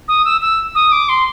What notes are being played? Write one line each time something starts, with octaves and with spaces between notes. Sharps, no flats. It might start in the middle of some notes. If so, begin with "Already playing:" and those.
D#6
E6
E6
D#6
D6
C6